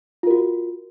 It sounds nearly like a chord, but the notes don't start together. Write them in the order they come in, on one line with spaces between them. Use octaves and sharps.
F4 A#4 F#4